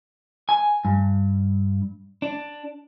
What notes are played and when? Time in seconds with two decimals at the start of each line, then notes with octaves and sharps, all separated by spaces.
0.49 G#5
0.85 G2
2.22 D4